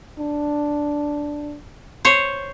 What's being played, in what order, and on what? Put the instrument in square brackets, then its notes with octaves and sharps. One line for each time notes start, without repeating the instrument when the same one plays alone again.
[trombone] D4
[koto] C5 C#5